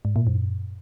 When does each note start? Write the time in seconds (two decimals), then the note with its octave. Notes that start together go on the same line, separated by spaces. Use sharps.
0.05 G#2
0.16 A#2
0.27 F#2